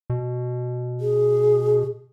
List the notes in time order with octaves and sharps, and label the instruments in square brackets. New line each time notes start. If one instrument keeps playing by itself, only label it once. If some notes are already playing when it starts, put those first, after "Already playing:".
[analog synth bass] B2
[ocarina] G#4